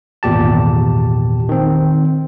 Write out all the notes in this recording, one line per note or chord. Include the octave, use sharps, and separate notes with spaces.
G#1 E2 A#2 G4 A5
D#3 C4